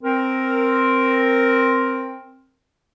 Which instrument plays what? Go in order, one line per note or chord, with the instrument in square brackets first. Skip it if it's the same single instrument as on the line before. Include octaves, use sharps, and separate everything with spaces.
[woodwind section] C4 A#4